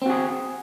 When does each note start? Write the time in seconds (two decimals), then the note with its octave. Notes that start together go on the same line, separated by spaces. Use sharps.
0.02 C4
0.06 F#4
0.10 G#4